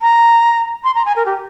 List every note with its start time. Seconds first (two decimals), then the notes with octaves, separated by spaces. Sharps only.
0.02 A#5
0.84 C6
0.95 A#5
1.05 G#5
1.16 A#4
1.26 G4